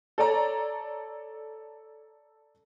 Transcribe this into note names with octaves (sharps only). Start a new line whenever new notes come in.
A4 C#5 D5 A#5